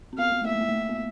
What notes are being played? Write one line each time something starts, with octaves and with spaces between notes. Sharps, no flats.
C4
B3 F5
B3
A3
A#3 E5
A3
A#3
A3
A#3
B3